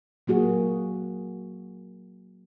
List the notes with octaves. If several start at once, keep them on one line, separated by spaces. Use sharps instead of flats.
F#3 A#3 F#4 G#4